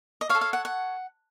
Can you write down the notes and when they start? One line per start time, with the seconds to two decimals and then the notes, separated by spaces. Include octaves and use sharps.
0.21 D#5
0.29 C#5 F5
0.35 A4
0.41 F5
0.53 F#5
0.65 F#5